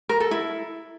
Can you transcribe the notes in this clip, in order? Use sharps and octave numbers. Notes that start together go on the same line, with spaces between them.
A#4
A4
E4